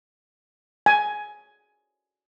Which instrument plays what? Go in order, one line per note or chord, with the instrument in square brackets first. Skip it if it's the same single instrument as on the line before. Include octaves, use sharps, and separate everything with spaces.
[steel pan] G#5